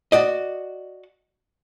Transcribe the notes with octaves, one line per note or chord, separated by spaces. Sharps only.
F#4 D5 D#5